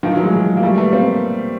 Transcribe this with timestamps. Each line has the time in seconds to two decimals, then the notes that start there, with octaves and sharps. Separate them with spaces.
0.03 D#3 F3
0.13 E3 F#3
0.23 F#3 G#3
0.33 F#3 G#3
0.57 A#3
0.63 G3 A3
0.78 A3 B3
0.93 A#3 C4